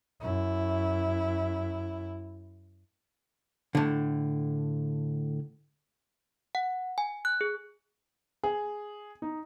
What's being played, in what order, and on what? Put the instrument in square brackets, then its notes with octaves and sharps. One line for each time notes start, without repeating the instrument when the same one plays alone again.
[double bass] F#2 E4
[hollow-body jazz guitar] A2 D3
[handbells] F#5
G#5
F#6
G#4
[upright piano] G#4
D#4